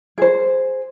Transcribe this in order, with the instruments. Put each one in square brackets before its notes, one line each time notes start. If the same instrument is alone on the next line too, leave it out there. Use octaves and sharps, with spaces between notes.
[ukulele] G#4 C5